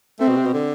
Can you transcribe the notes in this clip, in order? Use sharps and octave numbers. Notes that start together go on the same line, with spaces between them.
A3 C4
B2
C3
B2
D3